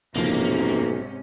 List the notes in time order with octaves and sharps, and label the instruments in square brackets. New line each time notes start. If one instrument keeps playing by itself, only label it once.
[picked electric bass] F#1 E2 F3 [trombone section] B1 [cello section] G#2 C3 C#4 [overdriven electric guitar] A#3